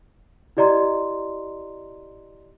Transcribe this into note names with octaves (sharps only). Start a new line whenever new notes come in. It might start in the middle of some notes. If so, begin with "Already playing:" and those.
E4 G4 D5 D#5 A#5 C6